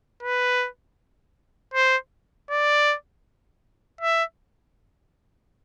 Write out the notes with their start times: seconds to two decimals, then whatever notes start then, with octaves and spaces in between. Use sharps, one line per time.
0.22 B4
1.74 C5
2.50 D5
4.01 E5